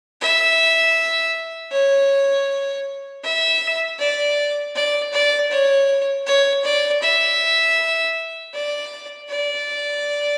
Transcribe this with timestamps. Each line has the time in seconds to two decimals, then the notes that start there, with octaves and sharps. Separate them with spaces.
0.21 E5
1.72 C#5
3.24 E5
3.99 D5
4.76 D5
5.13 D5
5.51 C#5
6.27 C#5
6.64 D5
7.02 E5
8.54 D5
9.29 D5